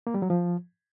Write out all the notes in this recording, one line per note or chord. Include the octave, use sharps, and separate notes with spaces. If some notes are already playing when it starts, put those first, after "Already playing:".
A#3
G3
F#3
F3